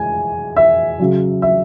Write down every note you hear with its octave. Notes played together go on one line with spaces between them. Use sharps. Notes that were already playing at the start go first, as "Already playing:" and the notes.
Already playing: G#3 G#5
E5
C#3 F#3
E5